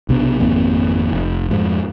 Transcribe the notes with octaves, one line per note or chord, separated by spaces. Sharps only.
B1 C3 B3 D4
G#1 F2 A#3 C4
F1
F2 G#2 F3